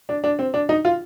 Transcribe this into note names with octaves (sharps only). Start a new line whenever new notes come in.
D4
D4
C4
D4
D#4
F4